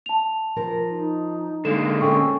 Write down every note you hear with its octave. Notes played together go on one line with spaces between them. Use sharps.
A5 F7
F3 A#4
D#4
D3 G#3 A#3 A4 E7
C4 C#4 A4 G5 C#6